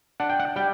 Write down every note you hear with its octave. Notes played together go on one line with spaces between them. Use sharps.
D4 F#5
G5
F#5
G3 G5